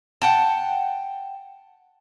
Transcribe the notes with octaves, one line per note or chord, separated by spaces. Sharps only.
F#5 G5 A5